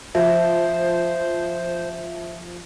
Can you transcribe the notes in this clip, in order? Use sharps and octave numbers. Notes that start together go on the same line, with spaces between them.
F3 C5 E5